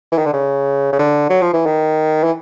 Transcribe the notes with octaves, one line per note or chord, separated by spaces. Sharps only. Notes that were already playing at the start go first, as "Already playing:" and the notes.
E3
D#3
D3
C#3
C#3
D3
F#3
F3
E3
D#3
E3